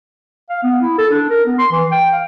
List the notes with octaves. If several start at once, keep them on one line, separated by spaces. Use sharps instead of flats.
F5
B3
E4
A4
D4
A#4
B3
C6
E3
G5
F5